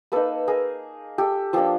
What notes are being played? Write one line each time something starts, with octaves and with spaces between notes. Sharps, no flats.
A#3 D#4 A4 B4
G#4 A#4
G4 A4
F3 A#3 D4 G4 A4